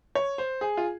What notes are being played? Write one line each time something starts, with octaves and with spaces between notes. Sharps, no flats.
C#5
C5
G#4
F4